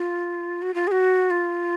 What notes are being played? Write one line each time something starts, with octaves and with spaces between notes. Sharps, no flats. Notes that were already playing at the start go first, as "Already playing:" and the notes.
Already playing: F4
F#4
F4
G#4
F#4
F4